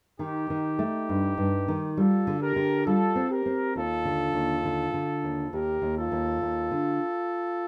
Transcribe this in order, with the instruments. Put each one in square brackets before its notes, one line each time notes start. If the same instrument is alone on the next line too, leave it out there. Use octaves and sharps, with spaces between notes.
[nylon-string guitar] D#3 [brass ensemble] D#4 G4
[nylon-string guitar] D#3
A3
G2
G2
D#3
[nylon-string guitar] G3 [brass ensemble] F4 A4
[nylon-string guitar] D3
[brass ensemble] G4 A#4
[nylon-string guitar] D3
[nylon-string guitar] G3 [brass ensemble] F4 A4
[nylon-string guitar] C4
[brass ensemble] G4 A#4
[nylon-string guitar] C4
[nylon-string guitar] D#2 [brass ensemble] F4 A4
[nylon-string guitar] D3
D#2
D3
D3
D#2
[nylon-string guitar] D#2 [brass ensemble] G4 A#4
[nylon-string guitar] D#2
[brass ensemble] F4 A4
[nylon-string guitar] D#2
D#2
D3